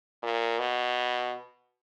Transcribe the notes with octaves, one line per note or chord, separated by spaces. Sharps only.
A#2
B2